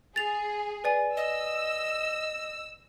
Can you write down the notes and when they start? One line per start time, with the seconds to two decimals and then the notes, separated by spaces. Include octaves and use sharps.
0.16 G#4 A6 F7
0.84 B4 D5 G#5
1.17 D#5 E6